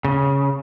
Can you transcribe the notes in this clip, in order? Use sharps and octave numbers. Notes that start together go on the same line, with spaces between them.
C#3